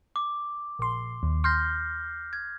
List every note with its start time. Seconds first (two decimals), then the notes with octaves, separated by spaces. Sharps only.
0.16 D6
0.79 A#1 C6
1.23 D#2
1.44 C6 F6 G6 A#6
2.33 G#6